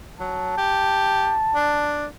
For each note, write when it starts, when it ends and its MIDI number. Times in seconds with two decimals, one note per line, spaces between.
0.20 0.55 54
0.20 2.06 81
0.58 1.34 67
1.55 2.06 62